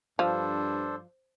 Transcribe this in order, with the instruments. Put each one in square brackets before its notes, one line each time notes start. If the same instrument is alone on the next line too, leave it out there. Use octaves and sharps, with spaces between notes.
[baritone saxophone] G2 [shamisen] F3 [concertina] D4 A4 C5